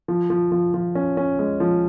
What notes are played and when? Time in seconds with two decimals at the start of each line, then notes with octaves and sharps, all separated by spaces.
0.08 F3
0.30 F3
0.52 F3
0.74 F3
0.95 C#4
1.17 C#4
1.39 G#3
1.60 F3